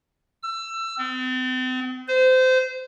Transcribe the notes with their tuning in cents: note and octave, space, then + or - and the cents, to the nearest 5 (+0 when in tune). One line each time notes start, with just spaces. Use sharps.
E6 +25
C4 -40
C5 -25